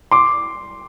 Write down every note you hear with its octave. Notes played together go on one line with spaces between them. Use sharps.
C6 D6